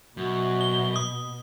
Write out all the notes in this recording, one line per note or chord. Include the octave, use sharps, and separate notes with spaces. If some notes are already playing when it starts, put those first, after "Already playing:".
F#2 B2 F#4
G7
D#6